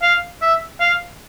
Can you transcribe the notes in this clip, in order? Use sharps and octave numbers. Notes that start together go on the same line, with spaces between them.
F5
E5
F5